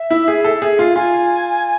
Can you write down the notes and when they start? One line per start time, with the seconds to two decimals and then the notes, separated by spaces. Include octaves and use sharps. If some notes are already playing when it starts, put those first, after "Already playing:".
Already playing: E5
0.10 E4
0.28 G#4
0.44 A4
0.62 G#4
0.79 F4
0.90 F5
0.96 F4 G#5